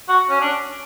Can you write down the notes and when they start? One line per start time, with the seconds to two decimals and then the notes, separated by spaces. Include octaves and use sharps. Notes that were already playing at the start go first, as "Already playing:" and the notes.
0.09 F#4
0.30 C#4
0.41 D4